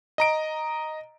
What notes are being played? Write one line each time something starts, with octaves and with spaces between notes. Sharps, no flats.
D#5 A#5 D7